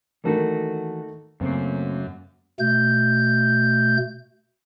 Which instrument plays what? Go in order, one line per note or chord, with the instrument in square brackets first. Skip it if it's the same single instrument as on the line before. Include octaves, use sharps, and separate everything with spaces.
[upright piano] D#3 A3 A#3 [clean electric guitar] E3 F#4 A4
[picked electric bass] F#2 [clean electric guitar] C#3 A3 A#3 [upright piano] C4
[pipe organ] B2 A3 G6